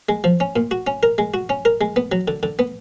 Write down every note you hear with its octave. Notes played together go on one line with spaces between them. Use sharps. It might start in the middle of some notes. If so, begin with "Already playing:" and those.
G#3
F3
C#4
A#2
F#4
C#4
A#4
G#3
F#4
C#4
A#4
G#3
B3
F#3
D3
D3
B3